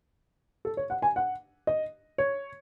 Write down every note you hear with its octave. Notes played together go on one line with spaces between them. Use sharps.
A4
C#5
F#5
G#5
F#5
D#5
C#5